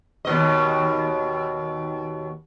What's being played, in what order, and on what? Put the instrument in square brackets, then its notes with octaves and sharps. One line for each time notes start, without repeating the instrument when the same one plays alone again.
[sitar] D#2 B2 D#5